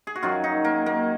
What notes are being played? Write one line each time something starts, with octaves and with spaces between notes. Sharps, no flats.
G#4
F#4
F#2 D#3 F#3 F4
D#4
A#3
A#3